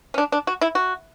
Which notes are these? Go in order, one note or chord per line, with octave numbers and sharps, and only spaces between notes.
C#4
D4
D4
F#4
E4
F#4